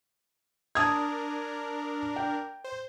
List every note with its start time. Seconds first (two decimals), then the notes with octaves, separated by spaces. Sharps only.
0.75 D4 A#4 A5 D#6 G#6
2.16 G5
2.64 C5